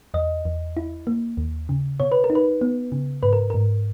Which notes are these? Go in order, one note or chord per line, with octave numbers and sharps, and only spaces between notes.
E2 D#5
E2
E4
A#3
D#2
C#3
B2 C#5
B4
A#4
D#4
B4
B3
C#3
G#2 B4
A#4
G#2 A#4